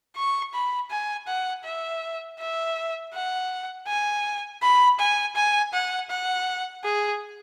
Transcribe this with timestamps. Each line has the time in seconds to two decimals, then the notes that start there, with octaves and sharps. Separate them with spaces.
0.16 C#6
0.54 B5
0.90 G#5
1.27 F#5
1.64 E5
2.39 E5
3.14 F#5
3.87 G#5
4.62 B5
4.99 G#5
5.36 G#5
5.73 F#5
6.10 F#5
6.84 G#4